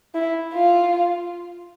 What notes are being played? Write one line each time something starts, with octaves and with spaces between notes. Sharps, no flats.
E4
F4